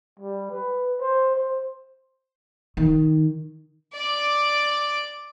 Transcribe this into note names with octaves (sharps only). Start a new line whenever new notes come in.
G3
B4
C5
C5
D#3
D5 D6